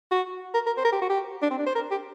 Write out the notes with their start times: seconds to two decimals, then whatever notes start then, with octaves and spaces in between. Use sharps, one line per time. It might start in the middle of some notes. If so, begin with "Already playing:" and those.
0.11 F#4
0.54 A#4
0.66 A#4
0.77 C5
0.85 A#4
0.92 G4
1.02 F#4
1.09 G4
1.42 D4
1.50 C4
1.59 D4
1.66 C5
1.75 A#4
1.91 G4